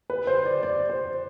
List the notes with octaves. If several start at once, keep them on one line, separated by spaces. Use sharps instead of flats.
B4
C5
D5
D5
C5